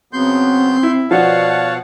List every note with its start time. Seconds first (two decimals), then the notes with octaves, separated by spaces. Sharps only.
0.13 C#3 F#3 B3 C4 C6 G6
0.83 E4
1.11 B2 F3 F#4 C#5 D5 F5 F#5 A5